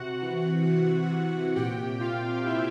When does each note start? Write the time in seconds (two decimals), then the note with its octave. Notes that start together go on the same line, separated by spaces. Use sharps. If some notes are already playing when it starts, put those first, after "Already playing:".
Already playing: C3 F#4 F#5
0.22 E3
0.67 E3
1.11 C3
1.56 A#2 G4 G5
2.01 A#2 F4 F5
2.46 A#2 E4 E5